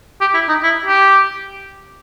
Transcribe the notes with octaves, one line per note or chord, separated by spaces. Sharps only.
G4
E4
D#4
E4
G4